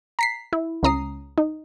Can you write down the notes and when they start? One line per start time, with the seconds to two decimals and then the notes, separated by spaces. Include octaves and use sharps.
0.19 A#5 B6 C7
0.53 E4
0.83 C#2 C#3 A#5 D#6 C7
1.38 D#4